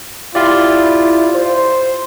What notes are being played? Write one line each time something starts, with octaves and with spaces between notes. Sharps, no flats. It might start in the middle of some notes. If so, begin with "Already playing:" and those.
E4 F4 G4 D5
C5